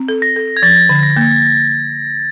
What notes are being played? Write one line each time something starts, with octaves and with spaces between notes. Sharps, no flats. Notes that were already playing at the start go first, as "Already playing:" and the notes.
Already playing: C4
A4
A#6
A4
G#6
F3 A6
D3
A#6
A#3